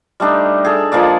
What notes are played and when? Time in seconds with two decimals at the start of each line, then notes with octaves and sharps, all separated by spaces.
0.20 G3 A3 D4 D#4
0.64 G#4 A4
0.92 F3 G#3 A#3 D5